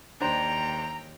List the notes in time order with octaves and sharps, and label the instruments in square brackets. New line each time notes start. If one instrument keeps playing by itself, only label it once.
[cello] D#2 G5 [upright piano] D4 C5 [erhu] A#5